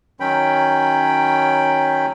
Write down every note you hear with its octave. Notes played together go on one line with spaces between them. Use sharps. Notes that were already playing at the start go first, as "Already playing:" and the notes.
D#3 F#3 C#4 G5 B5